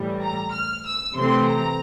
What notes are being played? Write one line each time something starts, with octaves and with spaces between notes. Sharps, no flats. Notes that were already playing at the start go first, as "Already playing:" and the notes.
Already playing: A2 E3 G3
A#5
F6
E6
C3 E3 A3 C4 C6
A#5